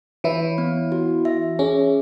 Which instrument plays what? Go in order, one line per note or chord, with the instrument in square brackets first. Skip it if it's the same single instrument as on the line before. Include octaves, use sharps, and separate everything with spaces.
[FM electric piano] E3 E4 [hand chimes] C#5
[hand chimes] B3
F#4
E5
[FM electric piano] C#4 [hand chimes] G#4